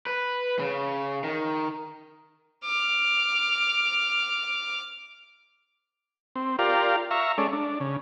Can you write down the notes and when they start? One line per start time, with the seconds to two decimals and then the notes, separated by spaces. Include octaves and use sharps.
0.06 B4
0.59 C#3
1.24 D#3
2.64 D6 F6
6.36 C4
6.59 F4 G4 A#4 D5 F5
7.11 E5 F5 A#5 C#6
7.38 G#3 C#4 A4 D5
7.52 D4
7.80 C#3